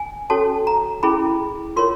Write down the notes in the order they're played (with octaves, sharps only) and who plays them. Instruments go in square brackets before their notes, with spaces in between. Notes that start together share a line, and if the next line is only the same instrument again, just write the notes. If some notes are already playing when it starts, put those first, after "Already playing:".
Already playing: [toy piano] G#5
C#4 F#4 A4 C#5 A5
A#5
C#4 E4 G#4 B5
F4 A#4 C#5 C6